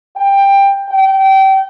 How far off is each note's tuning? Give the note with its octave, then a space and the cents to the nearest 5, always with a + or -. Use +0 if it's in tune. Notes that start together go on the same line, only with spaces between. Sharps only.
G5 +15
G5 -25